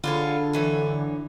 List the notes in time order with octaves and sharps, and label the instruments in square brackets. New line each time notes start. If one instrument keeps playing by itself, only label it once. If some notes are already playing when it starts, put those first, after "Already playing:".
[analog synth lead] D3 [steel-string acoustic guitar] F4 G#4 C#5 [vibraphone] A4 B5
[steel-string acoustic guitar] F#2 E3 C#5